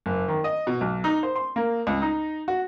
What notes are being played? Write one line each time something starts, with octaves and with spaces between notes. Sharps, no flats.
F#1
D#3
D#5
B2
B1
D#4
C5
C6
A#3
C#2
D#4
F#4